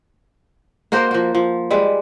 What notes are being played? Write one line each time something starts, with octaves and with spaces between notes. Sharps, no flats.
A#3 F#4 A#4 C5
F3 F#4
F3
G3 G#3 B4